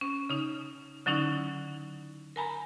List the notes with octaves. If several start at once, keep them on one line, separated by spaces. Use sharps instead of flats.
C#4
C#3 D#4
D3 F#3 C#4 D#4 E4
A#4 G#5 A#5 B5